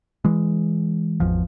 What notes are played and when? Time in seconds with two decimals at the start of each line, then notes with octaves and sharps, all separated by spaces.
0.25 E3 G#3
1.20 G#1 E2 F3